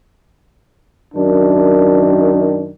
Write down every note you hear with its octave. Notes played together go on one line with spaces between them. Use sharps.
F#2 D#3 D4